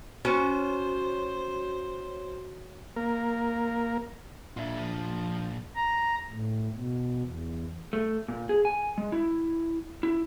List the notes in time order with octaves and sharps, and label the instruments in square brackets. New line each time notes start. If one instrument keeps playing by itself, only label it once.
[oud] C#4 [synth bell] F#4 C#5 [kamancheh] C5
[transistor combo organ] A#3 A#4
[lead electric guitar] A#2 D4 [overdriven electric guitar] F4 E5
[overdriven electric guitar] F3
[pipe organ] A#5
A2
B2
E2
[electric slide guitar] A3
A#2
G#4
G#5
G#3
E4
E4